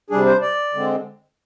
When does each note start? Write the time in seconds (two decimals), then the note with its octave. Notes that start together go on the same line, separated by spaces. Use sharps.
0.10 C3 G3 D4 G#4
0.26 C5
0.42 D5
0.74 D3 G#3 C4